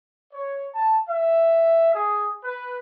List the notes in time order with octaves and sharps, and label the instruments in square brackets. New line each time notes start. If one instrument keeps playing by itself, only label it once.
[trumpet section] C#5
A5
E5
G#4
B4